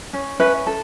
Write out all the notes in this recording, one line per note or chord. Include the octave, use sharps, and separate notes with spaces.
C#4
C#4 B4 E5
A4